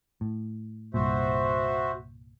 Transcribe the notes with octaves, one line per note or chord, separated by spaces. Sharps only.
A2
C2 G2 A#2 F#4 C5 E5